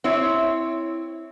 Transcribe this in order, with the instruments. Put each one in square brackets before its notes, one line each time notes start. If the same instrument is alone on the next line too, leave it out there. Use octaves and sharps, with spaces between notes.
[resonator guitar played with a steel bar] C4 E4 C#5